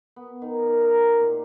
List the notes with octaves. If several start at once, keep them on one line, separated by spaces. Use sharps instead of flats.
B3
D#3
D#3
A#4
G4
A#2